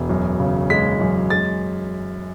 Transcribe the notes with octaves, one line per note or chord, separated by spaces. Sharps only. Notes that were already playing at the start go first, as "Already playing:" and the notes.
Already playing: E1
F#2
C#3
G#3 B6
F#2
G#3 A6